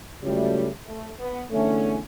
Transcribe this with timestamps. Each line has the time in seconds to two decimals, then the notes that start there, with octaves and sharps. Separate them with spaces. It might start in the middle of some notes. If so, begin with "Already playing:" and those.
0.22 C#2 C#3 F#3 G3 A3
0.87 A3
1.19 B3
1.52 E2 D3 A3 C#4